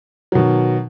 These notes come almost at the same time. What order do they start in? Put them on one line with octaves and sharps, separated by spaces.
F#3 B2 D#3